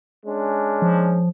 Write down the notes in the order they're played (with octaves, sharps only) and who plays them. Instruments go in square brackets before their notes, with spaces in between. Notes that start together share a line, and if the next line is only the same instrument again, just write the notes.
[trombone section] G#3 C#4 D4
[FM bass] F3